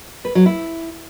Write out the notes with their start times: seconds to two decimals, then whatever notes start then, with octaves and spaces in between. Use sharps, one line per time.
0.25 B4
0.35 F#3
0.46 E4